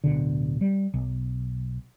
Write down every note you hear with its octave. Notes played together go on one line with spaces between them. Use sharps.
D1 G1 B2 D3
G3
B1